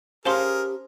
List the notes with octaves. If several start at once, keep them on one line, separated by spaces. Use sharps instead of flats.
C#4 G4 G#4 A#4 C5 F5 A5 C6